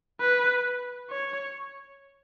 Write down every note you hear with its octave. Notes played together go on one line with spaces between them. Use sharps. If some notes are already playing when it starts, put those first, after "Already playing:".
B4
C#5